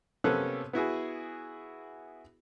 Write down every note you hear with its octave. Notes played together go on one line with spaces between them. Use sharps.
C3 A#3 B3 C#4 A4 F#6
B3 E4 F#4 G#4